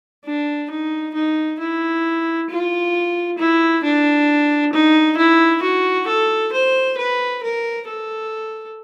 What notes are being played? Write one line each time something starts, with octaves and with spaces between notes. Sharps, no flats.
D4
D#4
D#4
E4
F4
E4
D4
D#4
E4
F#4
A4
C5
B4
A#4
A4